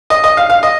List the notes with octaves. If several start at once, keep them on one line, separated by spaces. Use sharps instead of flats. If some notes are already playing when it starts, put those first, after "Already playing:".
D#5
D#5
F5
F5
D#5